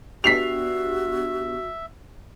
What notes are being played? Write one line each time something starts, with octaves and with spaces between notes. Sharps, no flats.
B3 D4 F#4 G4 E5 B6 C7 F7